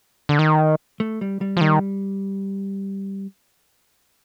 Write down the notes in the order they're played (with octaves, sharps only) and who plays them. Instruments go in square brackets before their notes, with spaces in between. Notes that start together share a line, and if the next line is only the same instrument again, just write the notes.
[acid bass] D3
D#3
[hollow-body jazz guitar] A3
G3
G3
[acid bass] F3
[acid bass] D#3 [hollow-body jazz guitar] G3